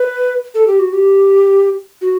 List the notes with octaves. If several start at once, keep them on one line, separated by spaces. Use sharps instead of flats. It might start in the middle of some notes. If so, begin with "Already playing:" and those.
Already playing: B4
A4
G4
F#4
G4
F#4